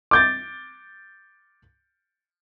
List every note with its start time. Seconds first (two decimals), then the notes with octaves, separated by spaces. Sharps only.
0.11 D6 G6 A6